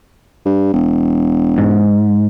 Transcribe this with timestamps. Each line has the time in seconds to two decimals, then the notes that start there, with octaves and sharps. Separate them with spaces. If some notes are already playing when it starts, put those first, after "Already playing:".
0.46 G2
0.73 E1
1.58 G#2